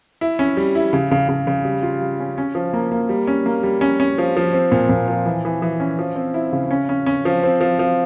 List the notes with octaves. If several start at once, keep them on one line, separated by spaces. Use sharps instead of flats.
E4
C#4
G3
E4
C#3
C#3
C#3
C#3
G3
F4
G3
C#4
C#4
F3
A#3
A#3
G3
C#4
A#3
G3
C#4
C#4
F3
F3
C4
A#2
A#2
F3
E3
E3
E3
C#4
F3
C4
E4
C#3
C#4
C#4
C#4
F3
C4
F3
F3